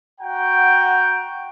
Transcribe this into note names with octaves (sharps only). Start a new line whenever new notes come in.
F#4 F#5 G5 A#5